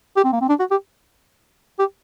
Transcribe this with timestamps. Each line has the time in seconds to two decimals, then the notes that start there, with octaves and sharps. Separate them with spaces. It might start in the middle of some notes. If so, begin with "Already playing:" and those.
0.16 G4
0.24 C4
0.32 A#3
0.41 C4
0.49 D4
0.59 F#4
0.71 G4
1.79 G4